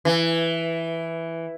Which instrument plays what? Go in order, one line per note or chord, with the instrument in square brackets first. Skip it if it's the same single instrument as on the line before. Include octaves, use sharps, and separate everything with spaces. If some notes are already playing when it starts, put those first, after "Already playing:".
[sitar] E3